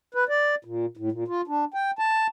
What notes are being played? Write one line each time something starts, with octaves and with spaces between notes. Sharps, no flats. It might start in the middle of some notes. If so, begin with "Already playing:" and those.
B4
D5
A#2
A2
A#2
F4
D4
G5
A5